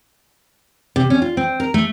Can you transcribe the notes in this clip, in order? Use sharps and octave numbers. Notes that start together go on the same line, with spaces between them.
C3
C#4
F4
C4
A#4
A3